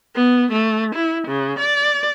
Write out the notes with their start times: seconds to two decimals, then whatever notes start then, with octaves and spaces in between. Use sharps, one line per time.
0.15 B3
0.51 A3
0.94 E4
1.27 C#3
1.58 D5